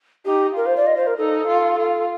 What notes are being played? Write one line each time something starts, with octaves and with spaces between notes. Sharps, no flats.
D#4 G4
F4 A#4
C5
D5
D#5
C5
A#4
D#4 A4
F4
F4